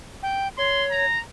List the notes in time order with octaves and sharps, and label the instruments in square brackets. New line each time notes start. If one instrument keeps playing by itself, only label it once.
[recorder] G5
[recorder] C#5 [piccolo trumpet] C6
[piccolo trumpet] A#5